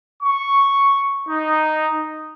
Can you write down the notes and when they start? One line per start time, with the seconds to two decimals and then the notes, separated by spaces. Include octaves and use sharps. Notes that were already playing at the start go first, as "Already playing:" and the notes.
0.23 C#6
1.29 D#4